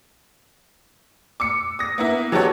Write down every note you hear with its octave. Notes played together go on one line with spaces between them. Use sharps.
D6 E6 C#7
D#6 A#6
A#3 B3 E4
E3 F#3 F#4 G4 A4 C#5